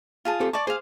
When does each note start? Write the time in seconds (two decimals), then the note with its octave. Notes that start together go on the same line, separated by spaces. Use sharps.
0.25 F4 G#4 A5
0.40 C4 G4 A4
0.53 D5 A5 C#6 D6
0.67 G#4 C5 F5